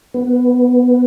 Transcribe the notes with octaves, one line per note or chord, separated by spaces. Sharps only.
B3